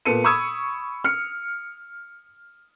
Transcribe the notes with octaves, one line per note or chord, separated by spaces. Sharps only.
A#2 B3 A4 C#7 D#7
B5 C#6 D#6 E6 G#6
F6 C#7